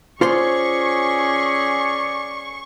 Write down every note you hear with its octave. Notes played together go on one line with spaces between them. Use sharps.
C#4 F4 G#4 C5 D5 C6 C#6